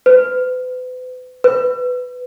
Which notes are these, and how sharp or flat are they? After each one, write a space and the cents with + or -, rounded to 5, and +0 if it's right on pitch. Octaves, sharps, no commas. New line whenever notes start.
B4 +40
B4 +15